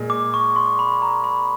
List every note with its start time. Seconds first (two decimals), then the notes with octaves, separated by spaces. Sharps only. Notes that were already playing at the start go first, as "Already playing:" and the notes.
Already playing: A#2 G#3
0.10 D6
0.34 C#6
0.56 C6
0.79 B5
1.02 A#5
1.24 B5